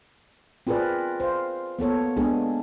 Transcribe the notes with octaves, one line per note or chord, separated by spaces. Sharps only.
C4 F4 G#4 A#4 B4 D5
C5 F5
A#3 B3 A4 C#5
G#3 A#3 B3 D4 G#4